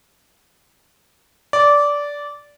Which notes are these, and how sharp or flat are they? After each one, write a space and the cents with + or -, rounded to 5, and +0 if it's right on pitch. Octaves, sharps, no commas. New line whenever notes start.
D5 -15